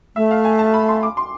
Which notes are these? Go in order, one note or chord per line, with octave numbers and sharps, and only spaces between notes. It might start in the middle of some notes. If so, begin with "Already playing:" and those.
A3 E5
F5
G#5
A5
B5
C6
D6
C6